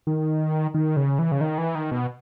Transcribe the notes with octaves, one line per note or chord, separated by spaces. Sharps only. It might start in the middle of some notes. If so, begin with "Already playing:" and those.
D#3
D#3
C#3
E3
C#3
D#3
E3
D#3
B2